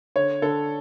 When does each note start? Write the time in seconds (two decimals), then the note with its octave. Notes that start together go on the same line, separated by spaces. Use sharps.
0.16 D3 C#5
0.42 D3 A4